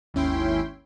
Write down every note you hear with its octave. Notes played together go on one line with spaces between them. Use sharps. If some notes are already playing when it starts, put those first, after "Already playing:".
G#1 D#2 C#4 E4 G5 C6